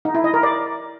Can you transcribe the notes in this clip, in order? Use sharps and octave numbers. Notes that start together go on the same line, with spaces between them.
D#4
E4
D#5
A#4
D5